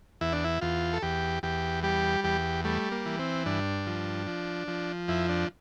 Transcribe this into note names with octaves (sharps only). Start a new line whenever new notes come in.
E2 E4
D4
E4
E2 F4
A4
E2 G4
E2 G4
G3 G4
E2 G4
G3 A3
A#3
E3
C4
G2 D4
F3
F3
F3
F2 E4
D4